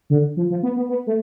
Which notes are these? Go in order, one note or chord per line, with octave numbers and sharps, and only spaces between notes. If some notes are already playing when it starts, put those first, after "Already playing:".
D3
F3
F3
B3
B3
B3
A3